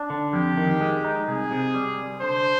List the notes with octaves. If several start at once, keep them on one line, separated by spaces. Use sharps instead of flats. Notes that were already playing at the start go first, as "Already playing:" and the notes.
Already playing: D4
D3
F2 G4
D#3
G#3
D#4
C2 G#4
C3
G3
C2
D3 C5